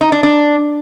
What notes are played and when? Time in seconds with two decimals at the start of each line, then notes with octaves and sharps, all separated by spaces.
0.01 D#4
0.12 D4
0.23 D4